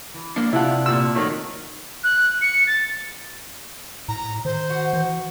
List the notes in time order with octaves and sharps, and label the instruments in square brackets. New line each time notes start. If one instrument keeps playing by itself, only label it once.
[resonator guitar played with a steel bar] E3
[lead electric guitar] A#3 D4
[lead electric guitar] C3 F#5 [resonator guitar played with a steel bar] D4 G4 [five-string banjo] E4 F4
[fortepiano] A#2 E6
[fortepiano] D#3 F#3 A3 [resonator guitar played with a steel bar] G#3
[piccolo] F#6
C#7
A6
[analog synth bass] A2 [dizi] A#5
[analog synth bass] D#3 [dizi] C5
[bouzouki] F#4
[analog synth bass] E3